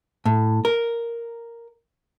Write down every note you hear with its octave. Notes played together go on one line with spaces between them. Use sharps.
A2
A#4